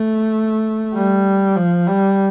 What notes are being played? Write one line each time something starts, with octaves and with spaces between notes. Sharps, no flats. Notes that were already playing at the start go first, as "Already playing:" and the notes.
Already playing: A3
G3
F3
G3